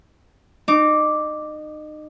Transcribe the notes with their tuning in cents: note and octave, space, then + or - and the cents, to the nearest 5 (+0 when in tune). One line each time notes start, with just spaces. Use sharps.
D#4 -30 D6 +0